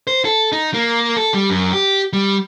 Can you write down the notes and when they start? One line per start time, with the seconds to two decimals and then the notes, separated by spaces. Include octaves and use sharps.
0.07 C5
0.25 A4
0.52 D#4
0.74 A#3
1.17 A4
1.34 G3
1.50 F#2
1.73 G4
2.13 G3